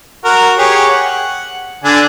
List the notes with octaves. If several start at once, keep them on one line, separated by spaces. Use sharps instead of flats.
F#4 A#4
G4 G#4 C#5
F#5
D3 D4 G#5